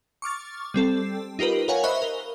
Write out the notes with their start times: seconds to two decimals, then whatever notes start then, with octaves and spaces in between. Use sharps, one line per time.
0.22 C#6 D6 F6 A6
0.74 G3 C4 A4
1.39 D#4 F4 G4 A#4 B4
1.68 A#4 B4 C#5 F5 F#5 G#5
1.83 C5 D#5 E5 B5 C#6 F#6
2.02 A#4 G7